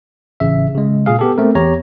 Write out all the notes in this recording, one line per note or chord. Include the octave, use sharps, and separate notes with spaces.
A1 C#3 E5
C#3 G#3
A#2 G#4 F5
B3 G4 A4
A3 C4 A#4
E2 G4 C#5 A#5